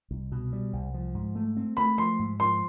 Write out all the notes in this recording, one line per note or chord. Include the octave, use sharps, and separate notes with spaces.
C2
B2
G3
C2
F3
G#2
A3
C4
A3 B5
F3 C6
G#2
F3 C6